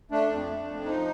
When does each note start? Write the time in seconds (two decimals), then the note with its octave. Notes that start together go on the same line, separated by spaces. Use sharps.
0.11 A3 D4
0.30 F2
0.49 A3
0.67 F2
0.86 F3 D#4